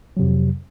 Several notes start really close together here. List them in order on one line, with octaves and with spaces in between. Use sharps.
F#3 C3 F2